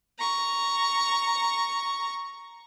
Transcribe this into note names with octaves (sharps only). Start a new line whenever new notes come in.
A#5 C#6